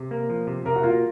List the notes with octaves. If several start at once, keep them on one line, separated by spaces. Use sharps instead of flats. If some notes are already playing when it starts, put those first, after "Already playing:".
Already playing: C3
A#3
F3
C3
C3 A#4
F#4
A#3 F4